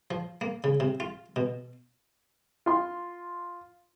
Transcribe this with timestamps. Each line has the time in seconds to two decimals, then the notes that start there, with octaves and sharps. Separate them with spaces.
0.11 F3
0.41 A#3
0.64 C#3
0.80 C3
1.00 F4
1.36 B2
2.66 F4 C6